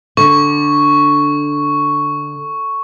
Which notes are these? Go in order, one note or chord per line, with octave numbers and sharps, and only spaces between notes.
D3 C#6